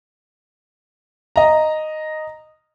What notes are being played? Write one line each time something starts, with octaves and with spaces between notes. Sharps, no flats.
D#5 A#5